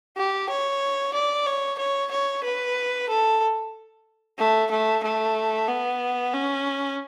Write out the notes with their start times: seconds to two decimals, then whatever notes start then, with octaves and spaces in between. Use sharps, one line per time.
0.17 G4
0.49 C#5
1.14 D5
1.46 C#5
1.78 C#5
2.11 C#5
2.44 B4
3.09 A4
4.39 A3
4.71 A3
5.03 A3
5.68 B3
6.34 C#4